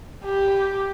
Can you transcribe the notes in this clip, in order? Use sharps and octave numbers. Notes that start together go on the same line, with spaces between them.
G4